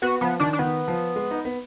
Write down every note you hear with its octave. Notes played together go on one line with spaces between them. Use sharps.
B3 F#4
F3 B3
D#3 D4
D4
D#3 B3
F3
G#3
D#4
B3